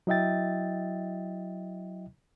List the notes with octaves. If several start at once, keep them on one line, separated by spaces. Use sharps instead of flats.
F#3 E4 D#5 E5 G5 A6